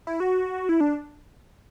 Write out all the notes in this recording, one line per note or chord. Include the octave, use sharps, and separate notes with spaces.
E4
F#4
E4
D4